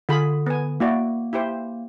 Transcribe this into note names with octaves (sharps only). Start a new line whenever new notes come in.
D3 F4 G#4 B5
B3 G#5
A#3 E4 F#4 D5
E4 G4 C5